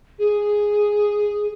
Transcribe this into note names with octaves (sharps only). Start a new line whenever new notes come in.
G#4